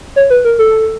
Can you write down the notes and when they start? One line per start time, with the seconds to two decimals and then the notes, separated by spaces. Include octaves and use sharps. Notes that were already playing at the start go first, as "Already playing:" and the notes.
0.16 C#5
0.30 B4
0.45 A#4
0.59 A4